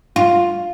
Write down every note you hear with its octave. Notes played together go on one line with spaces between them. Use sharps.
F4